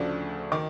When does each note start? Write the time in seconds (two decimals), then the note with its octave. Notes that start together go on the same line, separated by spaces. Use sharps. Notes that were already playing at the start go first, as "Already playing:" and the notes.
Already playing: D2 C#3 F3 A3 D4
0.52 D#3 D6